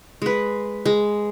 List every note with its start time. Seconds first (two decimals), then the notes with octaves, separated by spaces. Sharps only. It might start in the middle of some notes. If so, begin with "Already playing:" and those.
0.22 G#3 B4
0.85 G#3